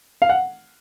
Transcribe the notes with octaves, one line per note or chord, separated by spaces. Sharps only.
F5
F#5